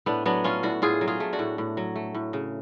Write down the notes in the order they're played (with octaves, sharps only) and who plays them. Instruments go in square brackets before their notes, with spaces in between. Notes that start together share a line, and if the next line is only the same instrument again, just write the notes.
[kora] A2 B3 D4
F#3 B3 D4
A3 C#4 F4
A2 D4 F#4
A2 F4 G#4
F#3
F4 G#4
A3
D4 F#4
A2
A2
F#3
A3
A2
C#3